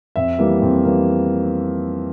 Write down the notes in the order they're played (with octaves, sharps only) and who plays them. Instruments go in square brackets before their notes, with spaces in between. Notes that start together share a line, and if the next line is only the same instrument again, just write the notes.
[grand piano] F2 E5
E3 G3 A#3
F2
E3 G3 A#3